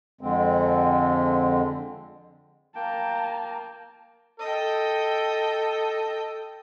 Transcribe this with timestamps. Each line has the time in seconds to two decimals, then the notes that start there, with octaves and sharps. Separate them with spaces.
0.21 F2 D3 G#3 C4
2.75 A#3 G5 A5 A#5
4.40 A4 D#5 G5